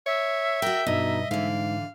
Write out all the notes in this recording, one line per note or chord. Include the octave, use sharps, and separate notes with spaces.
C#5 E5
F#4 A#4 G5
G2 B2 D#4 D#5 A#5
G#2 D3 E3 F5